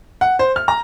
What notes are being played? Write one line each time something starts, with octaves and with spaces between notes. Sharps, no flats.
F#5
C5
F6
A#5